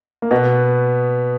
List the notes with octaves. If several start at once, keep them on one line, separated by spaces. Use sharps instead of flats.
A#3
B2 B3